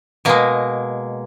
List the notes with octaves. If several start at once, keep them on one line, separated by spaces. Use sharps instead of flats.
B2 G#3 A#3